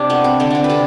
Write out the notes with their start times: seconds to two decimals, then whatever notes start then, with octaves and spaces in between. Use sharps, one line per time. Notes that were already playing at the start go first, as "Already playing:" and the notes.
Already playing: C3 D4
0.10 A3 B3
0.24 C4
0.40 D3 C4
0.50 C4 D4
0.64 B4
0.70 C3 A4